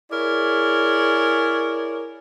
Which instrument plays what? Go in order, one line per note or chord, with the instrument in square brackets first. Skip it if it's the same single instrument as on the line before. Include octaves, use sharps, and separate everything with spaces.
[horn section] E4 G#4 A#4 C#5 D5